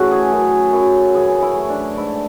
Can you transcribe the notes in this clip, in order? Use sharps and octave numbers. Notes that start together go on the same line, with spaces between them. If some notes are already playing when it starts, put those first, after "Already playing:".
Already playing: C#3 E3 A3 C#4 E4 F#4
G#4
F#2
F#2
E3 G#4
E4
A3
D4
G#2 E4